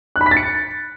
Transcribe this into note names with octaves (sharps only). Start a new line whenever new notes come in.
F#6
B5
B6
A6
C#7